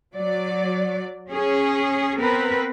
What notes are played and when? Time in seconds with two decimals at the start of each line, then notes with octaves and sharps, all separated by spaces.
0.14 F#3 D5
1.30 C#4 G#4
2.18 B3 C4 A#4 B4